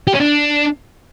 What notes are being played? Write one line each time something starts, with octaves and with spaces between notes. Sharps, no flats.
G4
C#4
D4